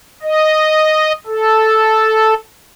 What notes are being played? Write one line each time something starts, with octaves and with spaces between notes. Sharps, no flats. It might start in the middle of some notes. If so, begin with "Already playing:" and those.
D#5
A4